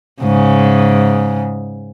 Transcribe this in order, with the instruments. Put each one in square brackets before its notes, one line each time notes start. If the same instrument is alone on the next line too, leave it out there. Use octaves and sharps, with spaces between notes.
[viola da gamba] G#2 C#3